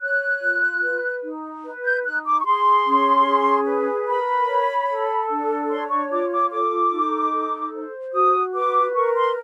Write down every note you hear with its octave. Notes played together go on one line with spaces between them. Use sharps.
C#5 F#6
F4
B4
D#4
B4
G6
D#4 F#6
D6
C#6
G#4 C6
C#4
G#4
B4
A#4 B5
C#5
A4
D4
C#5 C6
C#6
F4 D6
D6
A4 D6
D#4
A4
C5
F#4 D#6
B4 D6
A#4 C#6
C6